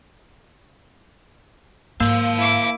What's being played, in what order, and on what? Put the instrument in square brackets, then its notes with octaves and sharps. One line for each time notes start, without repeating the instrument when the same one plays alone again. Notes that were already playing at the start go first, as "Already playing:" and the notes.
[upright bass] G#2 [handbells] A#3 [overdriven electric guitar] F5 A5
[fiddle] E4 D6